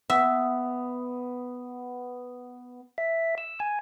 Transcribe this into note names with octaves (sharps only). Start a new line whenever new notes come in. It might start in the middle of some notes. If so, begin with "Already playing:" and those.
B3 E5
E5
E6
G#5